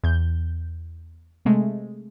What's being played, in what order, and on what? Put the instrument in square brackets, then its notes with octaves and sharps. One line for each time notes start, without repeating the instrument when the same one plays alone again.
[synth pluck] E2 G6
C3 G#3 A3